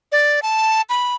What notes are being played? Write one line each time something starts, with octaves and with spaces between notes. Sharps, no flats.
D5
A5
B5